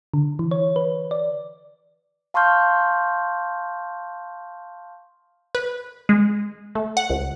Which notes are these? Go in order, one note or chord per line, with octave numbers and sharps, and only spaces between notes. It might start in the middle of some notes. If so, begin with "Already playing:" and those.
D3
E3
C#5
B4
D5
F5 A5 C6 C#6 F6 G6
B4
G#3
A3
F#5
C#2